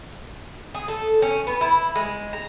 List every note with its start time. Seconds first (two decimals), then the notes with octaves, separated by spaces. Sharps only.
0.75 G#4
0.88 A4
1.22 C#4
1.47 B3
1.61 E4
1.95 G#3
2.33 A#5